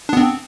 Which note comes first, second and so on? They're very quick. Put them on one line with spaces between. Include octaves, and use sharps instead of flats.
D4 B3 C4